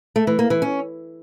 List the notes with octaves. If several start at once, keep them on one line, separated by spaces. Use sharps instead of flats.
A3
E3
A#3
E3
C#4